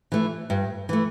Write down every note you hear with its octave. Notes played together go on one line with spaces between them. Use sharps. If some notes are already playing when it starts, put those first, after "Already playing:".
E3 A3
G2
E3 A3